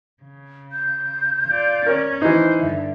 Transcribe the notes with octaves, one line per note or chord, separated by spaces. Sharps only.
C#3
G6
F4 D5
C#4 A#4 C#5
E3 D#4 C5
G2 D3 E5